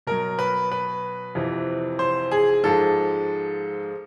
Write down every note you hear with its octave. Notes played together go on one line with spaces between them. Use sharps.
B2 F#3 A#4
B4
B4
F2 C3 E3
C5
G#4
G#2 F3 G#3 A4